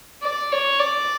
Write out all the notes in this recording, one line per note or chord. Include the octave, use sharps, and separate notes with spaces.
D5
C#5
D5